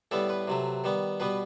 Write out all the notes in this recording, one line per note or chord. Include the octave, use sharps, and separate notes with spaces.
A2 G3 B3 A4
B4
C3 F#3 A3
D#3 G3 B3
B2 G3 B3 B4